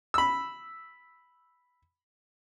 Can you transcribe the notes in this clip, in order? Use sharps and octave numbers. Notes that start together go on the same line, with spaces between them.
B5 E6